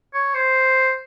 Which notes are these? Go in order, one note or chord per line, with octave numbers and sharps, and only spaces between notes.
C#5
C5